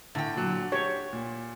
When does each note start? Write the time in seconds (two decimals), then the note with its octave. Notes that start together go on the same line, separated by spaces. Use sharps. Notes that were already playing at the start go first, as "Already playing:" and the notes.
0.15 A2 D3 G5
0.35 A#2 F#3
0.72 G4 C#5
1.13 A#2